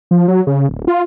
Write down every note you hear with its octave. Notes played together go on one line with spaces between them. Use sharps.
F3
F#3
C#3
D1
F4